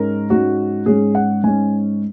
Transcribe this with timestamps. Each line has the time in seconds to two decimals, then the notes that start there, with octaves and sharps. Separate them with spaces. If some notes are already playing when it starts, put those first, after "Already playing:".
Already playing: G#2 G#3 C#4 A#4
0.30 G#2 G#3 C#4 F#4
0.86 G#2 G#3 C#4 G#4
1.15 F#5
1.44 G#2 G#3 C#4 G#5